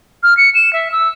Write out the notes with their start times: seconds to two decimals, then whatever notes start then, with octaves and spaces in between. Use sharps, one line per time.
0.23 F6
0.37 C#7
0.55 E7
0.73 E5
0.92 E6